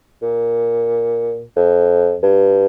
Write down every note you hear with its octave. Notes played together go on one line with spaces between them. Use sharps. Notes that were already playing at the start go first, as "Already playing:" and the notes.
A#2
F2
G2